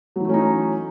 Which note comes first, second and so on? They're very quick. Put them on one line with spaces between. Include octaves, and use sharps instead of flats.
F#3 E3 A3 C#4 D#4